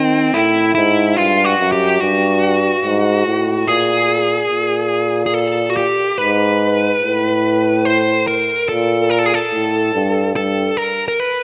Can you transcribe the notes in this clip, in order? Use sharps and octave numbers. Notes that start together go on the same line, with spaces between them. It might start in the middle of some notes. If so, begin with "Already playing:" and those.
Already playing: D#3 C4
A2 E4
G#2 E4
G2 F4
F#4
F#2
G4
G2 F#4
G#2
A2
A#2 G#4
A#2
G#4
A4
F#4
G4
G#2 B4
A2
C5
A#4
A#2 A4
A#4
A4
G#4
A4
A2
G2
G2 A4
A#4
A#4
B4